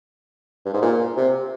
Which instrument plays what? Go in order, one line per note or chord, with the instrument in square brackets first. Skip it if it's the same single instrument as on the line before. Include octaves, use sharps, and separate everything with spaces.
[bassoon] G2
G#2
A#2
C3